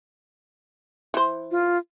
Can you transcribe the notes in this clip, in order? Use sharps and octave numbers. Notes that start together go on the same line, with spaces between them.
E3 C5
F4